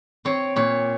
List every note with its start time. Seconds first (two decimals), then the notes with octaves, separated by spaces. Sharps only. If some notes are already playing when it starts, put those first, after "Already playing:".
0.25 C4 C#5
0.56 A#2 C#5